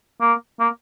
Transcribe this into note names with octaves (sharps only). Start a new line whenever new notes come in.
A#3
A#3